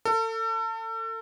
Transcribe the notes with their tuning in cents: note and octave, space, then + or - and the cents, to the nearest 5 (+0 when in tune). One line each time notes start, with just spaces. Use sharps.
A4 +35